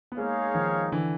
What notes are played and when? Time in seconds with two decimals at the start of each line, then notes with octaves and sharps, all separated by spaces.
0.12 B3
0.17 G#3 A#3 D#4 G#4 C#5 F5
0.54 D#3 F3
0.92 D3 E3